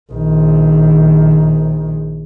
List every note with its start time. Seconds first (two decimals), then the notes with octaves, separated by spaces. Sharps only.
0.13 A#1 D#3